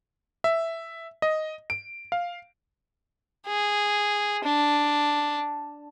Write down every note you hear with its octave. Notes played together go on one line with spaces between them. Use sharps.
E5
D#5
D7
F5
G#4
D4